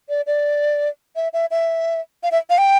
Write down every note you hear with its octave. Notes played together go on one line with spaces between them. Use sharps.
D5
D5
E5
E5
E5
F5
E5
F5
G5